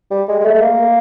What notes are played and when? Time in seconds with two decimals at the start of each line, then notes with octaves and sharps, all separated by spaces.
0.11 G3
0.28 G#3
0.41 G#3
0.44 A3
0.54 A3
0.61 A#3